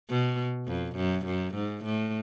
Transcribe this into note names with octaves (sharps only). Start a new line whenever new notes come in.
B2
F2
F#2
F#2
G#2
A2